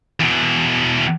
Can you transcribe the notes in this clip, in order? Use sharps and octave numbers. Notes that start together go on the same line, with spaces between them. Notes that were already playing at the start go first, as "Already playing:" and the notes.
E2 B2